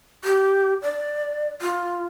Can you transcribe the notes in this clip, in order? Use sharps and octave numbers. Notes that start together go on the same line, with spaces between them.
G4
D5
F4